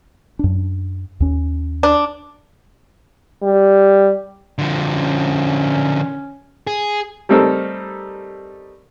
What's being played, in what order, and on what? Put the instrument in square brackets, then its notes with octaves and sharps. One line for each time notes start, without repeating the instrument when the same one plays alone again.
[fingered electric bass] F#2 D4
D#2 C#4
[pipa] D4
[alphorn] G3
[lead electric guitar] D3 F3
[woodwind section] C#4
[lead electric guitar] G#4
[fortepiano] G3 A3 C4 D#4 A4 A#4